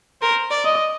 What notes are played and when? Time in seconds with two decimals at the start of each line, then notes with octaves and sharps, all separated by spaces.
0.22 A#4 C5
0.51 D5
0.65 D#5